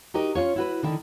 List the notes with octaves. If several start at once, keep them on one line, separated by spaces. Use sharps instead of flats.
D#4 F#4 G4 A#4 D#5
C#4 D4 F4 C#5
E4 F#4 B4
D3 D#3 E4